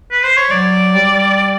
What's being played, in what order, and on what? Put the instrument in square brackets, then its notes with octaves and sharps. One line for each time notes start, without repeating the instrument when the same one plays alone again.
[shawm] B4
C5
C#5
[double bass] F#3 [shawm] D5
[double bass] G3